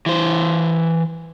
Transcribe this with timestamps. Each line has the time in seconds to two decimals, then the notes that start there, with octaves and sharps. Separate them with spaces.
0.06 E3 C5